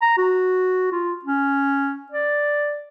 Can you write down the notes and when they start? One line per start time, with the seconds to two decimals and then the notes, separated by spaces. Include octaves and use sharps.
0.02 A#5
0.18 F#4
0.92 F4
1.25 C#4
2.12 D5